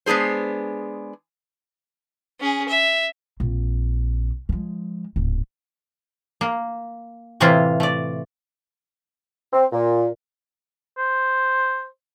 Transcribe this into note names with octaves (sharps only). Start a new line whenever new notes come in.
G#3 B3 D4 G#4 C5
C#4 G#4
E5
A#1 C4
F3 G#3
D1 G#2
A#3
A2 C3 E3 A#3 E4 F4
A3 D5
C4
A#2
C5